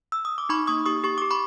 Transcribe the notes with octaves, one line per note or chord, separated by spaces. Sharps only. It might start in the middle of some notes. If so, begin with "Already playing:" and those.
E6
D#6
D6
D#4 B5 C#6
A#3 C#6 D#6
G4 C#6 D#6
G4 C#6
G4 D6
B5 C#6